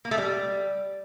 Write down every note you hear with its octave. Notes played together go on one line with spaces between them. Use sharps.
A#3
A3
G3